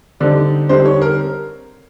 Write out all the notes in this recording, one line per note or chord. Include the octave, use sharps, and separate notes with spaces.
D3 G3 C4 D#4 D5
D3 G3 C4 D#4 C5
C#5
A#4